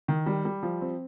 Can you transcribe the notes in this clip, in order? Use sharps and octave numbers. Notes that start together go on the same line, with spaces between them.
D#3
G3
G3
F3
C4